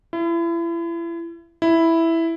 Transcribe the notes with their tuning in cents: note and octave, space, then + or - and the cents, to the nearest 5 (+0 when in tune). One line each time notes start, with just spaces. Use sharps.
E4 +35
E4 +0